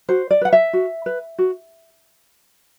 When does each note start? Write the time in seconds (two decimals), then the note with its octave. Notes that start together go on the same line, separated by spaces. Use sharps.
0.09 F#4 C5
0.31 D5
0.41 B4 F#5
0.53 E5
0.73 F#4
1.06 B4
1.38 F#4